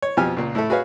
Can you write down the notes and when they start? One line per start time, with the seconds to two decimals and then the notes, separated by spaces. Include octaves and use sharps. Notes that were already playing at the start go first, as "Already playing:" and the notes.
0.02 C#5
0.17 F2 B2 F3 G4 G#5 F6
0.37 C#2 A#2
0.55 A2 A3 E4 A4
0.70 F#4 G#4 B4 C#5 F5